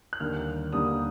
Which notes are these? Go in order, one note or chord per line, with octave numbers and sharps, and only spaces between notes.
F#6
D#2 D3 G3 A#3 F6
D#2 D3 G3 A#3 D#6